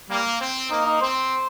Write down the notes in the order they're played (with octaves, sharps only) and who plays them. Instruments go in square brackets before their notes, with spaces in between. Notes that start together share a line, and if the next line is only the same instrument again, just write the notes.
[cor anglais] G3 [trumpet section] A#3
[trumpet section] C4
[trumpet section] A#3 [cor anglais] D#4
[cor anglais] D#4
[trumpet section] C4 [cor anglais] C5